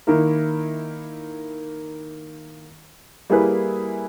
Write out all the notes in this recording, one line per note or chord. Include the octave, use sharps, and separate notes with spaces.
D#3 A#3 E4 A#4
G3 A#3 E4 G#4 B4